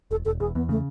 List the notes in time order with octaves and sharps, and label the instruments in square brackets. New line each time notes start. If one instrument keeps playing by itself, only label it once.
[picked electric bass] E1 [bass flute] A4
[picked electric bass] E1 [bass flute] A4
[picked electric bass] E2 [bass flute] G#4
[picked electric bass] E2 [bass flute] B3
[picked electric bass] C#3 [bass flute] A3